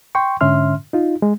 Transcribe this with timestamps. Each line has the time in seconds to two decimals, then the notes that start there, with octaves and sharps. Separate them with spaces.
0.15 G5 C6 C#6
0.41 G#2 D3 C#4 E5 C6 F6
0.93 D#4 F4
1.22 G#3